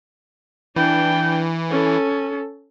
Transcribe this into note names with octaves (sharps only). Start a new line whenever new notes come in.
E3 D4 G5
C#4 A4